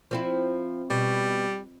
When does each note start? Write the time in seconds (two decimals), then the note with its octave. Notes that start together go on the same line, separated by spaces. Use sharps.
0.11 F3 C4 E4
0.90 B2 G3